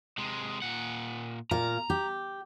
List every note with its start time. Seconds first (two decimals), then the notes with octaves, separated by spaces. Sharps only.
0.18 C3 G#3
0.62 A#2 F#5
1.51 A#2 F5 A#5
1.90 G4